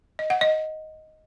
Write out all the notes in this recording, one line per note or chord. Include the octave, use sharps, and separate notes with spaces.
D#5
F#5
D#5